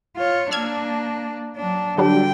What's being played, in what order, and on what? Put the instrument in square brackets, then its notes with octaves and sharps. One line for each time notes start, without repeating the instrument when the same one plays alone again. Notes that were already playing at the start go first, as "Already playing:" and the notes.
[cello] F4 C#5
[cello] A#3 D4 [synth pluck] E6 F6 G#6
[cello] F#3 D4
[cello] D3 G5 [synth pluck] F#3 G3 D4